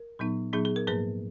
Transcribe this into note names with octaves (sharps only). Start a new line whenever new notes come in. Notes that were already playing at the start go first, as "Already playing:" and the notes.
Already playing: A#4
A#2 F#3 B3 D#4
A#2 F#3 B3 D#4 G#4
G#4
A#4
G#2 F3 A#3 G#4 B4